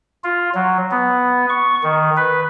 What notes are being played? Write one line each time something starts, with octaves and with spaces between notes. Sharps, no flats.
F4
F#3
B3
C#6
D#3
B4